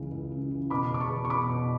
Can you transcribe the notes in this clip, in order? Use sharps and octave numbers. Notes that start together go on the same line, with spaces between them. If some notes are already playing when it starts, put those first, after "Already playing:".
Already playing: C#2 C#3 E3
C#2
C#3
E3
B2 B5 D6
E2 D6
A5 C#6
E2
C#6
B2 B5 D6
B2